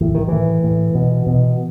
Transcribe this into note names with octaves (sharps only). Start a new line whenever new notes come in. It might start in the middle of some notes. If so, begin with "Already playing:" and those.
A2 E3
D#3
A2 E3
A2
B2
B2